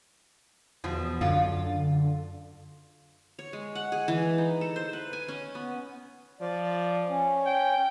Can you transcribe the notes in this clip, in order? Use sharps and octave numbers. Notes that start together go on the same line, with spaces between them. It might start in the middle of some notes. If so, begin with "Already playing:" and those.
E2 B2 F3
F#2 D3 F4
C#5
G#3
F#5
G#4
E3
D#4
A4
C5
B4
G#5
C#4
B3
F3 D5
C#4
G5